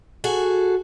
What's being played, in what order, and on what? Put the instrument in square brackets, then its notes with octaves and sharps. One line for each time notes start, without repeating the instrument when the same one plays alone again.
[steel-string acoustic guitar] F#4 G#4 A4